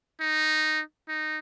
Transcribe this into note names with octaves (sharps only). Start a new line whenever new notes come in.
D#4
D#4